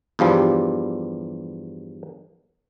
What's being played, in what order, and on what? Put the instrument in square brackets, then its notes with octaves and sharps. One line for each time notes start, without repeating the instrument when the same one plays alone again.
[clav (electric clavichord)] E2 G2 F3 G3